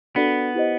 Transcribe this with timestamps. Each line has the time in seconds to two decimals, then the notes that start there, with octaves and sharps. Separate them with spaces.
0.16 B3 D4 F#4 A4 D5
0.55 E4 G4 C5 D#5